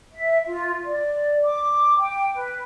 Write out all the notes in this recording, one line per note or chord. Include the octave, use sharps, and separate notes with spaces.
E5
F4
D5
D6
G5
B4